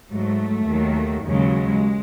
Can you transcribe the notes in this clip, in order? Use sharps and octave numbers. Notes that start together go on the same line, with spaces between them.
G#2 F#3 A3
D#2 D#3 F#3
D#2 C#3 F#3 G#3